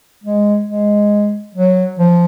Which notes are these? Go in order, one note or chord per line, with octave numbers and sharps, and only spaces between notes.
G#3
G#3
F#3
F3